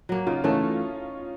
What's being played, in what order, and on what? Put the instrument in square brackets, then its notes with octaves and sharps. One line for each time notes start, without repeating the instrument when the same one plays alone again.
[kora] F#3 A#3
[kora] C#3 [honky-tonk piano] D#4 F4
[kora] E3 A3 [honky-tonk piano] C#4 D#4